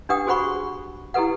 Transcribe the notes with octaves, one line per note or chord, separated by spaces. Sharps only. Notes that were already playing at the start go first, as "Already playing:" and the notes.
D4 G4 B4 F#5 G5 D#6
F#4 G#4 C5 F#5 B5 C#6
E4 G4 A4 B4 F#5